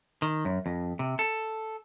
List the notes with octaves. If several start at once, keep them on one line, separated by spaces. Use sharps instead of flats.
D#3
F#2
F2
C3
A4